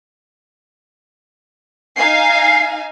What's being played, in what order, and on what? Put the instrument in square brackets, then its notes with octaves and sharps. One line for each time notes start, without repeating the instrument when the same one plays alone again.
[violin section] D#4 F5 G#5 [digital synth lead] C7